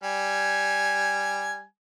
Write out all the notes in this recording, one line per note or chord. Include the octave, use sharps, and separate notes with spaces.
G3 G#5